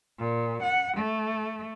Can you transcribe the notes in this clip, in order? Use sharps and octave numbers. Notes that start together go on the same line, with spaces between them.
A#2
F#5
A3